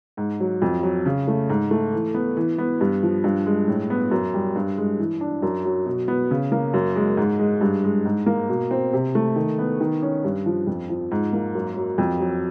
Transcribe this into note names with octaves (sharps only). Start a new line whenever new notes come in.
G#2
F#3
F2
F#3
C#3
A3
G#2
A3
E3
B3
E3
B3
G2
F3
G2
G#3
A2
B3
F#2
G3
G2
G#3
E3
D4
F#2
F#3
B2
B3
C#3
A#3
F#2
G#3
G#2
G#3
G2
G#3
G#2
A#3
B2
C4
C3
A3
D#3
B3
D#3
C#4
G2
F3
F2
F3
G#2
A#3
F#2
F#3
F2
F#3